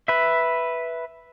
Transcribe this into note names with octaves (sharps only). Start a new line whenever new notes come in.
B4 E5